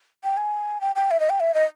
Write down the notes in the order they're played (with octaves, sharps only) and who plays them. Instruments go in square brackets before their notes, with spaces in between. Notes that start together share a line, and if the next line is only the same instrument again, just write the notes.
[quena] G5
G#5
G5
G5
E5
D#5
G5
E5
D#5